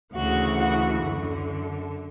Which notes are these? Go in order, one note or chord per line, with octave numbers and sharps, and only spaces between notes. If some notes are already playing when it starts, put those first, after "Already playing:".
D2 C#3 E3 F#4
F#4
F#2 D3